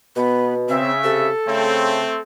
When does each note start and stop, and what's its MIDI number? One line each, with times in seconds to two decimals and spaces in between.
0.16 0.77 47
0.16 0.54 59
0.69 1.30 49
0.69 0.91 60
0.69 1.30 76
1.04 1.30 48
1.04 2.21 69
1.47 2.02 49
1.47 2.19 57
1.47 2.19 60